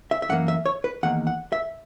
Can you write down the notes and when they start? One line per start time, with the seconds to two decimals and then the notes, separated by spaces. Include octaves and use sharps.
0.11 E5
0.22 E5
0.29 F#2 E3 A#3 F#5
0.48 E5
0.66 C#5
0.84 B4
1.03 E2 D#3 A#3 F#5
1.27 F#5
1.52 E5